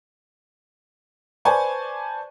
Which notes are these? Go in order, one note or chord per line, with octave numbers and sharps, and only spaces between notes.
B4 C5 D5 G#5 A5 C#6